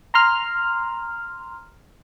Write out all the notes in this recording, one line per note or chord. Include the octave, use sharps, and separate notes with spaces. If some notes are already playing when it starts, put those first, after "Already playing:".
A#5 C6 F6